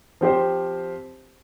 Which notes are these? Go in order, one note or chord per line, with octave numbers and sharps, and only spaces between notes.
F3 C4 G4 C5